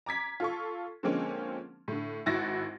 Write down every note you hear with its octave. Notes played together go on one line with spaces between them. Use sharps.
A#5 D6 G#6 B6
F4 A4 C#6
D3 F3 G#3 A#3 C4 C#4
A2 D3
G#1 E4 F#4 A6 A#6